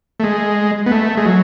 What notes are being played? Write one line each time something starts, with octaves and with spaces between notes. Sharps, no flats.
A3
G#3
B3
A3
G#3
F#3